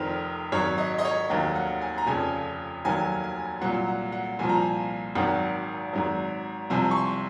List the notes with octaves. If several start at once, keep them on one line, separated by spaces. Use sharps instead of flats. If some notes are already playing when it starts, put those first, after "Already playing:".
Already playing: F1 F2 D#3 C5
G#1 G#2 F#3 C#5
D#5
D#5
C#5
F1 D#2 D#3 F#3
F#5
G#5
A#5
F1 F2 C#3 F3 G#5
F1 D#2 D#3 F#3 G#5
G#5
C2 A#2 F#3 F#5
F#5
F#5
C2 A#2 F3 G#5
A#5
G#5
G#1 G#2 D#3 F#3 F#5
G#1 G#2 F#3
C2 C3 F3 G#5
C#6
C6